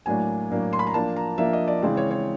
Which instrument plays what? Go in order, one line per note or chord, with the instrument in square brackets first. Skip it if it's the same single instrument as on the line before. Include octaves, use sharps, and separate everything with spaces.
[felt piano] A2 F#3 A#3 D4 G#5
A2 F#3 A#3 D4
C6
B5
A#5
F3 A#3 D4 A5
A#5
F3 A#3 D4 E5
D#5
D5
C#3 E3 G#3 C4 D5
C#5
C#5